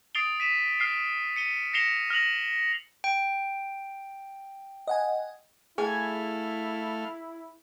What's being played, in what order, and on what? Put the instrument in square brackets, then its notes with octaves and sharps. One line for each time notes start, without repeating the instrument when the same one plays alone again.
[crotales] D#6 A6 C7 D7 F7 G7
B6 D#7 E7
F6 C7
C#7 D#7 G7
A#6 C7 C#7 E7 F7 G7
F6 A#6 F7 F#7
[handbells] G5
[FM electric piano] D#5 F#5 G#5
[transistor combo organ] A3 F5 [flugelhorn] E4 [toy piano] G#4 [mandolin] G#5